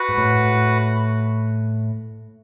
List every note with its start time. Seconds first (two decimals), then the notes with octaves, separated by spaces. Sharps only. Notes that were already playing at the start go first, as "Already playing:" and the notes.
Already playing: F#4 B4 F#5
0.09 G#2
0.18 A2